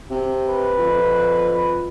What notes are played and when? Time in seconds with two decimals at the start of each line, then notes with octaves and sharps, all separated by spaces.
0.11 C3
0.47 B4
0.78 F2